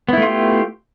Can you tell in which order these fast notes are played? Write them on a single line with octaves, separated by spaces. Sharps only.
B3 E4 A3 F4 G4